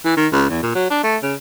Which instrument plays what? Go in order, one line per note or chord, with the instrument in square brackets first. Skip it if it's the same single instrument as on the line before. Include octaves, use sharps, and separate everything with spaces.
[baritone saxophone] E3
D#3
C#2
E2
A#2
F#3
D4
A3
C#3